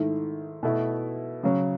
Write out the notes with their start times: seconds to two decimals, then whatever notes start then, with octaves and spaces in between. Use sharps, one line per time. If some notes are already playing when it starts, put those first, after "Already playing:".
Already playing: G#2 D#3 A3 E4
0.63 B2 A3 E4
1.43 C#3 F#3 C#4